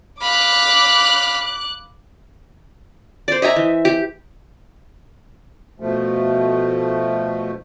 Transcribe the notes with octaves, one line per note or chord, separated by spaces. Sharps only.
F5 B5 D6 F#6
C5 D5
D#5 E5 G#5 A#5
E3
G4
B2 F3 A3